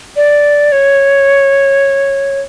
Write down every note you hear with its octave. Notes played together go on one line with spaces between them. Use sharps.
D5
C#5